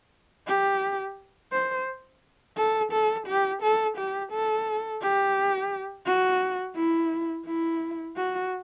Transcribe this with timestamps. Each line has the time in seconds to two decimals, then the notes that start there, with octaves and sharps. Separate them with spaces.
0.48 G4
1.52 C5
2.57 A4
2.92 A4
3.27 G4
3.62 A4
3.97 G4
4.32 A4
5.02 G4
6.07 F#4
6.77 E4
7.46 E4
8.17 F#4